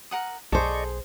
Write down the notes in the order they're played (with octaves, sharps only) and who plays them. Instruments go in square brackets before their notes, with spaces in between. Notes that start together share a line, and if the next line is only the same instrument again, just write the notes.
[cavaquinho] A#4 F#5 D#6
[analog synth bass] B1 [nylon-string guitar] G#4 C5 [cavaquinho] A4 [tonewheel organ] D5 D#5 C#6